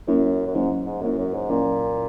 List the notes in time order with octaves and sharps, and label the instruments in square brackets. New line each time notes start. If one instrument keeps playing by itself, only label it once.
[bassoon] F#2 [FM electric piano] F#3 A#3 C#4 E4
[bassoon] F#2
[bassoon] G#2 [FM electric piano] F#3 A#3 C#4 E4
[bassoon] G#2
[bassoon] F#2 [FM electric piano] F#3 A#3 C#4 E4
[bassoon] F#2
G#2
[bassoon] A#2 [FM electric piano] F#3 A#3 C#4 E4